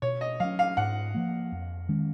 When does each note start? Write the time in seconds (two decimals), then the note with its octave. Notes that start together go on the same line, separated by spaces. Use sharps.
0.02 B2 C#5
0.21 D#5
0.40 F#3 C#4 F5
0.59 F5
0.77 G#2 F#5
1.14 F3 A#3
1.52 F2
1.89 D#3 G#3 C#4